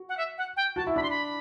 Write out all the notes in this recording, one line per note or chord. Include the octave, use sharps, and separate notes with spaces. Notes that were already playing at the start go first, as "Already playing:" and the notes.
Already playing: F#4
F#5
E5
F#5
G5
F#4 A5
E4
D4 B5
C6
B5